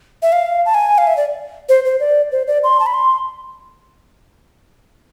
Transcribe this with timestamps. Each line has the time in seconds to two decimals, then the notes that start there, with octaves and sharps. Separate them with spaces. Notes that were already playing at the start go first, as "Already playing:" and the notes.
0.22 E5
0.32 F5
0.66 A5
0.74 G#5
0.98 F5
1.07 E5
1.17 D5
1.69 C5
1.85 C5
2.00 D5
2.32 C5
2.47 D5
2.64 C6
2.80 A5
2.86 B5
2.94 C6